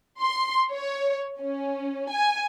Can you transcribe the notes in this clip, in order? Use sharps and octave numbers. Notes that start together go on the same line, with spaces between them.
C6
C#5
C#4
G#5